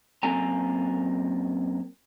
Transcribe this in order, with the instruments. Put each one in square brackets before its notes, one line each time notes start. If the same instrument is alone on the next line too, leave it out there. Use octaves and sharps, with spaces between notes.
[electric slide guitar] F#2 A#3 C4 A4 G#5 A#5